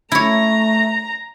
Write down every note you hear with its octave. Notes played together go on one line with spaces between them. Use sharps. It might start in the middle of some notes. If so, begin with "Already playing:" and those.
A3 E4 C#5 A#5